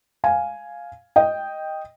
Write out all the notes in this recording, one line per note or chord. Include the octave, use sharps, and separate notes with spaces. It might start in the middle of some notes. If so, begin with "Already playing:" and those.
F5 G#5
D#5 G5